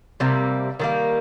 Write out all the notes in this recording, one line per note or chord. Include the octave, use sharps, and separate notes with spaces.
C3 G3 A#3
D#3 G3 A#3